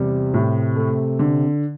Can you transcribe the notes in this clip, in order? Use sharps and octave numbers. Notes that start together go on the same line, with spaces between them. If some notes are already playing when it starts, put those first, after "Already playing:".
Already playing: E2 C3 G3
A2
A3
D3